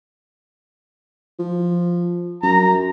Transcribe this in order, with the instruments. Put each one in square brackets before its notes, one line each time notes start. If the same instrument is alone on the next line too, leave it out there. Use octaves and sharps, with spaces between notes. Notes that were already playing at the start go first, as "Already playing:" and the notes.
[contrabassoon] F3
[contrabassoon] F#2 [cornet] A#5